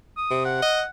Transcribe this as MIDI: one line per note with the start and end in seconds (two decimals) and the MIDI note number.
0.17 0.45 87
0.30 0.58 48
0.45 0.88 78
0.62 0.82 75